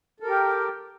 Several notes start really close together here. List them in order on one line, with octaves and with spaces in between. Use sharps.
A4 A#4 G4 G5